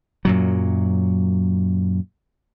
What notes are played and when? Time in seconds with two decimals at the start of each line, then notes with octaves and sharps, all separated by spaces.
0.25 F#2 A#2 F#3